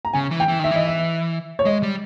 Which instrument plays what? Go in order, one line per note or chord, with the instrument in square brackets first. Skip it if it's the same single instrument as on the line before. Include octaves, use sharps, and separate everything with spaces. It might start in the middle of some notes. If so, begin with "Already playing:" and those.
[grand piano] A#5
[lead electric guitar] C#3 [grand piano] G#5
[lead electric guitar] E3
[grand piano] G5
[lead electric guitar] E3
[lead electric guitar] D#3 [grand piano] E5
[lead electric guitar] E3 [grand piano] D#5
[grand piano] E5
C#5
[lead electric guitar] G#3 [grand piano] D#5
[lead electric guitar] G3